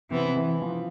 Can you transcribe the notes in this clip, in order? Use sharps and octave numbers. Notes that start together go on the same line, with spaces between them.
C3 E3 B3 C4 E4
E3 E4
F3 F4